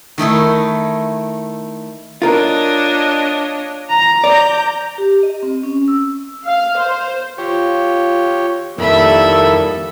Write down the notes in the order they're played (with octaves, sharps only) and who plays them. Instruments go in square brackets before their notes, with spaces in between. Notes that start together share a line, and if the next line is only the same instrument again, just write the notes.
[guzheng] D#3 A3 D#4 E4
[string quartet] D4 C#5 D#5 [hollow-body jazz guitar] F4 A#4
[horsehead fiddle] A#5
[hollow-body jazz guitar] D5 [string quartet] D6 G6
[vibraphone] G4
D#5
C4
C#4
E6
[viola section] F5
C5
[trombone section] F4 [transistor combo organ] G4 C#5
[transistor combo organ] F2 D#3 E4 [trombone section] G3 A#3 [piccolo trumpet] A4 [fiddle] E5 B5